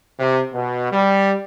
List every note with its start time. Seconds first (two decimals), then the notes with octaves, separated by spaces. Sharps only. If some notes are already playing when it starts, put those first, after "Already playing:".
0.19 C3
0.53 B2
0.92 G3